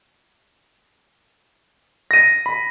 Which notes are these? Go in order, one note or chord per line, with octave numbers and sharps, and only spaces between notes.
A#6 D#7
B5